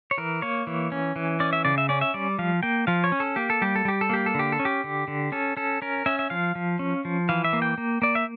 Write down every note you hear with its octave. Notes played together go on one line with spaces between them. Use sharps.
C#5
E3 A#4
A#3 C#5
E3
C#4
E3
C#4 D5
E5
C#3 D5
E5
C#4 D5
E5
G3 D5
F3 F5
A#3 G5
F3 F5
C#5
C#4
A4
A#3 G4
A4
G3 G4
A4
G3 G4
A4
A#3 G4
A4
D3 G4
A4
C#4
G4
D3
D3
C#4 A4
C#4 A4
C#4 A#4
C#4 E5
E5
F3 F5
F3
C#4
F3
E3 F5
E5
A#3
G5
A#3
A#3 D5
E5